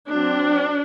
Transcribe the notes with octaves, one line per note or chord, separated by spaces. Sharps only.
F#3 C4 D4